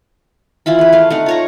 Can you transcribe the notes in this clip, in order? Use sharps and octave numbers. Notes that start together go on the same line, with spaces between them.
E3 E4 F4 B5
G#4 B4
A3 F5
A3 D#4 F#5
F4 C#5 A#5